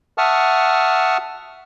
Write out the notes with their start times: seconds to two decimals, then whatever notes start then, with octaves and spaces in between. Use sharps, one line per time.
0.18 E5 F#5 A5 C#6 D#6 F6